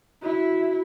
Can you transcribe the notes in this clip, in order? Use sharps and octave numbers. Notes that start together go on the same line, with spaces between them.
E4 F#4